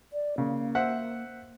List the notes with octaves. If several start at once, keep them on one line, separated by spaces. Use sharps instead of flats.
D5
C#3 A#3
C5 E5 F#5